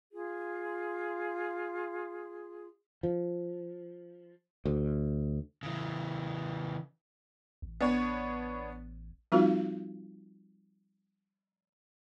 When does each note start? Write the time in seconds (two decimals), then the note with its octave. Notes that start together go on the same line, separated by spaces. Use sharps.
0.12 F4 G#4
3.03 F3
4.66 D2
5.63 C#3 E3
7.62 A1
7.81 B3 D4 C#5
9.32 F3 G3 C4 D#4 F4 F#4